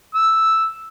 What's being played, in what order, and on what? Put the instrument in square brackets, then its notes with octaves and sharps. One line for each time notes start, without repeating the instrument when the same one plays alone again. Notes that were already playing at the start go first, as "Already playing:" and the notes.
[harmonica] E6